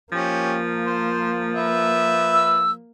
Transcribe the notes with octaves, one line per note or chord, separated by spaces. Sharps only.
F3 A#3 C#4 G4
C5
B4 E5
E6